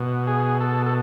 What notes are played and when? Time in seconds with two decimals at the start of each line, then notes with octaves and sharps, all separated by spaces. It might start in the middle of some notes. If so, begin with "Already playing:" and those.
Already playing: B2
0.27 G#4
0.60 A4
0.86 A4